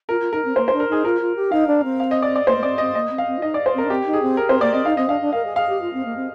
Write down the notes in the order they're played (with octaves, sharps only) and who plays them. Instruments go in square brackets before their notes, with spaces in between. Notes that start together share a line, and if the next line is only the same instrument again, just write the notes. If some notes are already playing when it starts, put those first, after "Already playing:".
[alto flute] F4 [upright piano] A#4
[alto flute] F4
[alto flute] D#4 [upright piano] A#4
[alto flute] C4
[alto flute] A#3 [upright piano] C5
[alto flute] D4 [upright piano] C5
[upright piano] A#4
[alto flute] D#4 [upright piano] G#4
[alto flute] F4 [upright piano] A#4
[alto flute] F4
G4
[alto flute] D#4 [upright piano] F5
[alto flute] D4
C4
[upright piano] F5
D#5
D5
D5
[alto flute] A#3 [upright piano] C5
[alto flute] A#3
[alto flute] C4 [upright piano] D5
[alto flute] C4 [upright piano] D#5
[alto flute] A#3 [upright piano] D#5
[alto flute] C4
[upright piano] F5
[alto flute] C4
F4
[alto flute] D#4 [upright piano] D#5
[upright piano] D5
C5
[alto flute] C4 [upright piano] A#4
[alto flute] D4
[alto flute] C4 [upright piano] G4
[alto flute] D#4
[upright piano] G#4
[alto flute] C4
[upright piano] A#4
[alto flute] C4 [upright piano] C5
[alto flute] A#3 [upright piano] D5
[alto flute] C4 [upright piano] D#5
[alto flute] D#4 [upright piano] F5
[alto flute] C4 [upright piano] D#5
[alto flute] D4 [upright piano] F5
[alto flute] D4
[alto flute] A#4 [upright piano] F5
[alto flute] G#4
[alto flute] G#4 [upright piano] F5
[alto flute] G4
F4
C4
A#3
C4